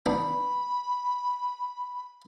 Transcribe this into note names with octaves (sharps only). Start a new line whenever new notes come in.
B3 D4 D#4 B5